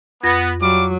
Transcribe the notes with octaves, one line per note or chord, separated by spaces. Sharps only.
F2 B3 A#6
F#3 G3 F5 D6